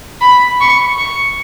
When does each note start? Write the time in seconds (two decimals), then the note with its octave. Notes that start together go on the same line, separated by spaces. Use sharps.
0.21 B5
0.60 C#6
0.98 C#6